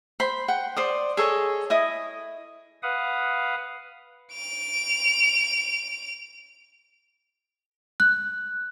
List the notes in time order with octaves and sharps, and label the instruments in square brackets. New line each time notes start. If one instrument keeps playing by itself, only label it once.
[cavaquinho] C5 B5
F#5 G5
C5 D5 D#6
G#4 A4 C#5 D#5
E4 D#5 D#6
[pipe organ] B4 F5 F#5 D#6
[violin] D7 F7
[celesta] F#6